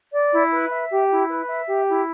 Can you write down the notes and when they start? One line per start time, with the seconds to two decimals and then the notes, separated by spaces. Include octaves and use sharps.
0.13 D5
0.32 E4
0.52 B4
0.70 E5
0.90 G4
1.10 E4
1.29 B4
1.48 E5
1.68 G4
1.86 E4